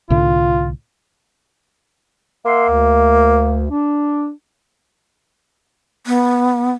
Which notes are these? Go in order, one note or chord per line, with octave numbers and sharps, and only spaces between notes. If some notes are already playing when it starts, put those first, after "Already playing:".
C2 A2 D3 F4
A#3 E5 F#5 C6
D2
D4
B3